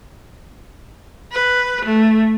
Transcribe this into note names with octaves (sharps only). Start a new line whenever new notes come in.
B4
A3